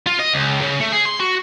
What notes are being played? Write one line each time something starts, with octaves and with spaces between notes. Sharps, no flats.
F4
D#5
C#2
C#3
A3
G#4
C6
F#4